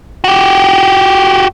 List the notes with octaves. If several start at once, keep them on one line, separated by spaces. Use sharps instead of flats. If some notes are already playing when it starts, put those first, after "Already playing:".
F#4 G4